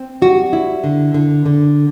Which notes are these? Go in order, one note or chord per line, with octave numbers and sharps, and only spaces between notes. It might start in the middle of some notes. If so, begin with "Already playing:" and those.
Already playing: C4
G3 F#4
E4
D3
D3
D3